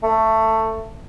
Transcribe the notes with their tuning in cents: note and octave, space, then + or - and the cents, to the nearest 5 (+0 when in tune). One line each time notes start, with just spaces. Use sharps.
A3 +15